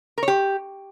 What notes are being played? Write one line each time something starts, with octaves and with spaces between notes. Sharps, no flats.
A#4
C#5
G4